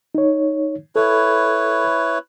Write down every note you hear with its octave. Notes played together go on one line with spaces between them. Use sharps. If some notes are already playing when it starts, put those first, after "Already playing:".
D#4 C#5
E4 A4 B4 C#5